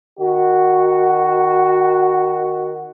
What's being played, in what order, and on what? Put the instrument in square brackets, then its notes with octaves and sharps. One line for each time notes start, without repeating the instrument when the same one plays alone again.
[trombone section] D#3 F#4